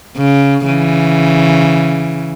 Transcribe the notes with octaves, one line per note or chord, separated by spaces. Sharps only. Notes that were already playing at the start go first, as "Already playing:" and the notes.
C#3
C#3 E3